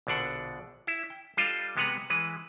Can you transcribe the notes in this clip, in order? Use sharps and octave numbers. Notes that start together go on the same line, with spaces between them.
A#1 B2 D3 D4 F#5
E4
G5
G3 D4 F4 A4 D#5 F5
C3 G#3 B3 B4 F#5 A#5
E3 G#3 B4